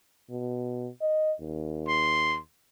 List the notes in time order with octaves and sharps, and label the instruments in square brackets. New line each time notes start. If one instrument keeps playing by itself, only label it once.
[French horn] B2
D#5
D#2
[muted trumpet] C6